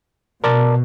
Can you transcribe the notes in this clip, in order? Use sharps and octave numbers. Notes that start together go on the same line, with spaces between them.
B2 A#4 D5 A5